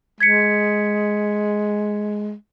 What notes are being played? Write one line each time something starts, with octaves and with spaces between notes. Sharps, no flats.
G#3 G#6 B6 C#7